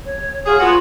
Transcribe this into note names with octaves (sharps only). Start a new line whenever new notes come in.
C#5
F4 F#4 G#4
B3 F4 F#4